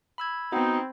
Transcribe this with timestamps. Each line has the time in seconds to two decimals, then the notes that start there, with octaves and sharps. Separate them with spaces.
0.18 B5 E6 G#6
0.52 B3 C4 D#4 F#4